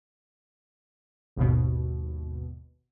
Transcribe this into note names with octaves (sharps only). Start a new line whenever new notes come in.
G#1 D#2 B2